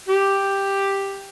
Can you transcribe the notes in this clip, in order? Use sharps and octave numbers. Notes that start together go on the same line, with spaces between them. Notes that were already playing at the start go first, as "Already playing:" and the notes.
G4